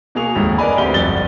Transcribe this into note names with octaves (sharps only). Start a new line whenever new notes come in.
B2 A#3 G#4 C#6 F7
F1 D#2 G#2
A#4 B4 D5 D#5 G#5 B5
D2 C4 G4 B5 G7
G1 F2 G3 A6 G7